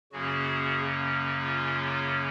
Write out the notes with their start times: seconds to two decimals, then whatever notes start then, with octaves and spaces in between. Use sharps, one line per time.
0.12 F#2 C#3 F#3 A#3 C#4 F#4 G#4
1.41 F4